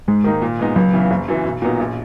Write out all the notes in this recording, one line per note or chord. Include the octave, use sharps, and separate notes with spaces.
G#2 G#3
D#3 A#3 D#4
A#2
G#3 B3 D#4
C#2 F#3
C#3 E3 B3
F#1
F#2 E3
B1
A#2 F#3 B3 D#4
A#1